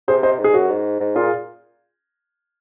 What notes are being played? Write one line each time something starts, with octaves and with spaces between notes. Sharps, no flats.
C3 G#4 C5
C5 D#5
G#2
G#4
F#2 F#4
G#2
G#2
A#2 F4 G#4